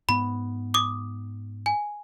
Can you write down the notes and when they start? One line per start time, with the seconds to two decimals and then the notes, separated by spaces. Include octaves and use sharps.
0.09 G#2 B3 B5
0.74 D6 D#6
1.66 G#5